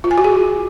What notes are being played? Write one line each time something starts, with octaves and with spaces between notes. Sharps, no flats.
F4
G#5
F#4
G#4